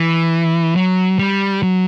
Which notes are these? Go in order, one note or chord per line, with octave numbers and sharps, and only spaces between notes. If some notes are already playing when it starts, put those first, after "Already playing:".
Already playing: E3
F#3
G3
F#3